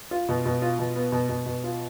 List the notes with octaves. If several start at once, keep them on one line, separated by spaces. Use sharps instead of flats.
F4
B2
B2
F4
B2
B3
B2
B2
B2
F4